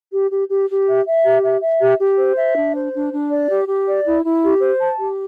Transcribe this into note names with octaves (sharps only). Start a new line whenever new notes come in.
G4
G4
G4
G4
E5
E5
G4
E5
E5
G4
G4
C5
E5
D4
C5
D4
D4
D5
G4
G4
D5
E4
E4
G4
C5
A5
G4